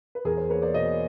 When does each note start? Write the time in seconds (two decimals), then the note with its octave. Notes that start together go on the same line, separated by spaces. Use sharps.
0.15 B4
0.25 E2 G#4 A#4
0.37 A#4 C5
0.49 A#3 B4 C#5
0.62 C5 D5
0.74 B2 C#5 D#5